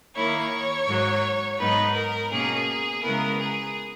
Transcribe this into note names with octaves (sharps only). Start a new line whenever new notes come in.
D#3 A#3 E4 C#5
G#2 F#3 A#3
G#2 F#3 B3 D#4 B4
A#4
B2 A#3 C#4 G#4
C#3 G#3 B3 E4 A#4
G#4